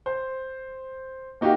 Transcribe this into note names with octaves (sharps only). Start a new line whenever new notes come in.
C5
A#3 D#4 F#4 G4 F5